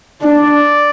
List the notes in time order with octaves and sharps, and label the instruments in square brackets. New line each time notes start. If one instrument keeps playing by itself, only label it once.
[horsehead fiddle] D4 [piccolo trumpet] D5